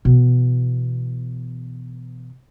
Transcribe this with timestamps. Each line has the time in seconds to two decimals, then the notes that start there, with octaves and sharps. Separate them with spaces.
0.05 B2 E3